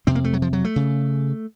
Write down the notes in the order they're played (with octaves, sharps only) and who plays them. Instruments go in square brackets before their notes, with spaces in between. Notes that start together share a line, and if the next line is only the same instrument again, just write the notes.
[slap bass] F2 C3 C4
A#3
A3
F#3
F3
F#3
A3
C#3